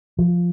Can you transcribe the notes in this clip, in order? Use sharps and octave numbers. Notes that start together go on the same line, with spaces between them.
F3